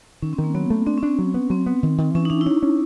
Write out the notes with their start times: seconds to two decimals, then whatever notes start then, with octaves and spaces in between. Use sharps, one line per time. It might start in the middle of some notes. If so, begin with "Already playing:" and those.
0.22 D#3 C#4
0.33 C4
0.38 D#3
0.44 A#3
0.54 F#3 B3
0.70 A3
0.87 C4 D4
0.98 C#4
1.03 D4
1.08 C4
1.19 F#3
1.34 B3
1.50 F#3 C4
1.66 B3
1.83 D#3
1.98 D#3
2.14 E3 C#4
2.25 D#4
2.30 E3 D4
2.41 E4
2.46 C#4 D#4
2.63 C#4